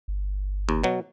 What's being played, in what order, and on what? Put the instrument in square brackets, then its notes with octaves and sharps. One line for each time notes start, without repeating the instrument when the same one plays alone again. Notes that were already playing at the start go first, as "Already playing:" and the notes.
[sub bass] G1
[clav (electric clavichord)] D#2
B2 F#3